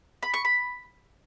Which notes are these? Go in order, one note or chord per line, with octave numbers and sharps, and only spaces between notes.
B5
C#6
B5